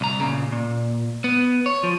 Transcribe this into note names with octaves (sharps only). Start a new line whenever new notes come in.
C2 A#5
A#2 C#3
A#2
B3
C#5
F3